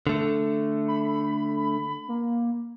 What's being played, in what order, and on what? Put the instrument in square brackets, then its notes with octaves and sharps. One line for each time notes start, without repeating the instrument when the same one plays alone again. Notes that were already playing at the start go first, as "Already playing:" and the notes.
[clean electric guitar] D3 A3
[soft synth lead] B5
A#3